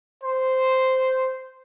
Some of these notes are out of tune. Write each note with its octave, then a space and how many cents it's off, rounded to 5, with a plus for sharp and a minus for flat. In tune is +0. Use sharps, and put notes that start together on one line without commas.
C5 -10